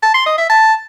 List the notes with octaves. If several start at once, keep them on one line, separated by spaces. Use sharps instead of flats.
A5
C6
D#5
E5
A5